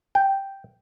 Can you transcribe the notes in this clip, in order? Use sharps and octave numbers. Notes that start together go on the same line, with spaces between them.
G5